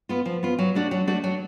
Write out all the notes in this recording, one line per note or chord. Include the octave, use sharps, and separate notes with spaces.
B3 F4
F3
B3 F4
F#3
A3 D4 F#4
F#3
A3 D4 F#4
F#3